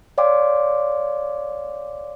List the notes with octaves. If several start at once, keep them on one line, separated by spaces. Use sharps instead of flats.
C#5 D5 F5 G5 C6 D6